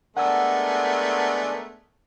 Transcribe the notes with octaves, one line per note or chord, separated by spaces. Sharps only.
G#3 A3 B3 D4 A#4 F#5 G#5 E6